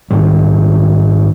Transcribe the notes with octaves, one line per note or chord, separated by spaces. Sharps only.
G#2 D#3 G3